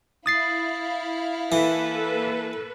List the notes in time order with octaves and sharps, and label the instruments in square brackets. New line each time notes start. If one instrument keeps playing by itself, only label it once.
[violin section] E4 F5 [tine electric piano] D#6 A6 C7
[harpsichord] E3 [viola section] A#3 A4 B4